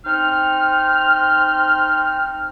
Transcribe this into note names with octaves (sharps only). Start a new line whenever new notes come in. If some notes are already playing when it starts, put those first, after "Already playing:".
C4 D#4 F6